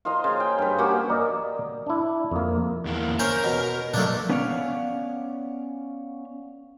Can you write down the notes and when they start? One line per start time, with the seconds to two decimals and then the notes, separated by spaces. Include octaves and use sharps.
0.05 F4 C5 D#5 A#5
0.24 C#3
0.40 G5
0.59 G2 B4
0.78 A#3 C#4 F#4 G4
1.09 A#4 D5 D#5
1.86 D4 E4
2.31 F2 A#3
2.86 E2 A#3
3.19 C#4 A#4 C5
3.44 B2
3.94 B2 F#3 A3 A#3 D4
4.29 B3 C#4 C#5 D5 F5 F#5